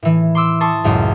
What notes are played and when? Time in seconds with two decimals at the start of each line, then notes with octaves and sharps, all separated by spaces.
0.03 A2 E3
0.35 C6 D6 E6
0.61 A5 C6 C#6 D#6
0.84 C#2 F#2 A2